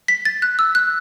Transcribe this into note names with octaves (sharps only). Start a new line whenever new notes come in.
B6
A6
F#6
E6
F#6